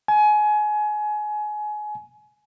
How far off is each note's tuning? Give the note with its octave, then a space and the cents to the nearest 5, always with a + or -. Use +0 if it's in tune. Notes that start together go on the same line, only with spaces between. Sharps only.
G#5 +25